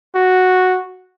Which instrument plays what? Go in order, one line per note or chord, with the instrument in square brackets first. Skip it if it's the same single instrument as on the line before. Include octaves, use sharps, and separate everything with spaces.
[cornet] F#4